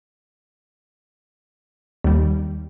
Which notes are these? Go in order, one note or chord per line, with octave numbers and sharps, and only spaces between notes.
D#2 G3